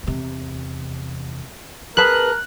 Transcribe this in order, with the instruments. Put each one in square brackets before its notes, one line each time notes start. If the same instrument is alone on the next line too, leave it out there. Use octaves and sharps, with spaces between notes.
[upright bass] E2 C3
[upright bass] C4 [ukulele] G#4 B4 A5 [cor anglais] A#4 [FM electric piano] F#6